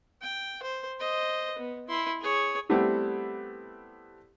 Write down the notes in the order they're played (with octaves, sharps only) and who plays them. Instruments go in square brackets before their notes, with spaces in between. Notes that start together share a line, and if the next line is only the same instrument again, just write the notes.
[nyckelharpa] G5
C5
C5 D#5
B3
E4 C6
G#4 C#5
[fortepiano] G3 A3 B3 C4 E4 G4